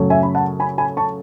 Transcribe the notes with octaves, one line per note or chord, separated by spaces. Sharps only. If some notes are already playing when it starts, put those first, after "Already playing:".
Already playing: F#2 C#3 F#3 A3
E5 G#5
B5
F#5 A5
G#5 B5
G#5 B5
A5 C#6